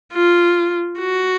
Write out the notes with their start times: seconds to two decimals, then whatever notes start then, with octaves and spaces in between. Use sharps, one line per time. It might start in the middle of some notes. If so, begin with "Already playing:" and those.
0.13 F4
0.99 F#4